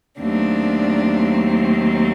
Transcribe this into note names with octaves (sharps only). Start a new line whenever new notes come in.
D#2 D#3 F#3 A3 C4 D4